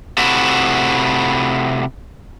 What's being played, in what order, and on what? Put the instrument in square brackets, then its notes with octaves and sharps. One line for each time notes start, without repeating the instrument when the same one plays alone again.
[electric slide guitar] C3 A3 E4 F#4